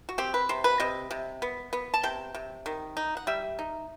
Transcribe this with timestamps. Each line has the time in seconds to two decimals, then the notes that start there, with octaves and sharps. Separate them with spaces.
0.09 F#4
0.18 C4 G4
0.34 B4
0.49 C3 C5
0.64 B4
0.80 C3 D#5
1.11 C3
1.42 B3
1.73 B3
1.94 A5
2.03 C3 G5
2.35 C3
2.66 D#3
2.97 D#4
3.17 F#5
3.27 G3 E5
3.59 D#4